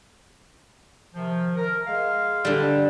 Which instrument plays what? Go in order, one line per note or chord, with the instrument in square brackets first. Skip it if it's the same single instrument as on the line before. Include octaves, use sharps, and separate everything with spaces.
[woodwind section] C3 D#3 F3
A#4
G#3 G#4 F5
[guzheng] D3 G3